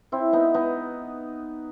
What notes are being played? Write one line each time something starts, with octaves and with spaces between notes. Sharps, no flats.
C4 E4
B3 D#4
B3 D#4